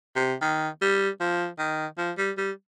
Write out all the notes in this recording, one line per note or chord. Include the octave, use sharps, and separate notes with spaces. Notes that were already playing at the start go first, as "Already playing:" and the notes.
C3
D#3
G3
F3
D#3
F3
G3
G3